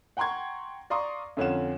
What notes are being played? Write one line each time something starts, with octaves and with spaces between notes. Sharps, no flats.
F#5 G5 A#5 C6 C#6 G#6
D5 F5 A#5 C6 C#6 D#6
F2 D3 C#4 F4 F#5 E7